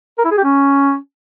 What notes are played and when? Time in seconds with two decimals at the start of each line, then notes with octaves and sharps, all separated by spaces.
0.18 A#4
0.25 E4
0.31 G#4
0.37 G4
0.44 C#4